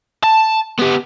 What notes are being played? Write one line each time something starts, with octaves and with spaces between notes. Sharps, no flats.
A5
B3 G4